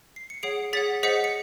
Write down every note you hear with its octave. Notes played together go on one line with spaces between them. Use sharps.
C7
C#7
G#4 C#5 F#5 C7 D7
G#4 C#5 F#5 A6 B6
G#4 C5 D#5 F#5 B6 C#7
C#7